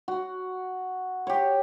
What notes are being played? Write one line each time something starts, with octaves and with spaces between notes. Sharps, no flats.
F#4
G4 C#5